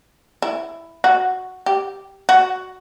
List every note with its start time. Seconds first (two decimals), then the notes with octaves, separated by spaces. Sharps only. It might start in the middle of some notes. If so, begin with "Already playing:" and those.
0.42 E4
1.04 F#4
1.66 G4
2.29 F#4